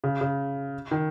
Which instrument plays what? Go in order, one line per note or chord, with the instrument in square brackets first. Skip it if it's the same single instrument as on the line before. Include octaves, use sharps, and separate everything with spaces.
[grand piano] C#3
C#3
D#3